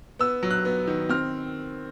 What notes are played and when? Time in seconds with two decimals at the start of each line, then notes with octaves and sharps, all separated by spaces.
0.19 B3 E6
0.43 F#3
0.51 F#6
0.65 B3
0.87 D#3
1.09 C4 F6